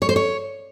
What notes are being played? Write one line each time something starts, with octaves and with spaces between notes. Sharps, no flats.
C#5
C5
C#5